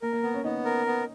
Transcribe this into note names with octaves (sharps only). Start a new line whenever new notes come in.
A#3 A#4
A#3
B3
C#4
B3 D#4
A#4
B3